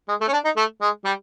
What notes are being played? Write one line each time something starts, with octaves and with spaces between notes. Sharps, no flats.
G#3
A3
C#4
D4
D#4
A3
G#3
G3